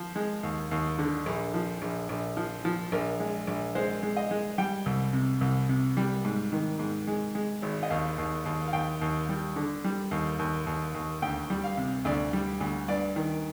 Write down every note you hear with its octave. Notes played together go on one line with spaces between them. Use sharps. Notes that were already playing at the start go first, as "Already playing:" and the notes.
Already playing: F3
G#3
D#2
D#2
D3
A#1
F3
A#1
A#1
F3
F3
A#1 A#4
G#3
A#1
G#3 C5
G#3
D#5
G#3
G3 G5
C2
C3
C2
C3
G3
G#2
D#3
G#2
G#3
G#3
G#1
D#5
D#2 F5
D#2
D#2
F5
D#2 G5
D#2
G3
D3
G3
D#2
D#2
D#2
D#2
D2 G5
G3
F5
C3
D2 D5
G3
D2
G2 D5
D#3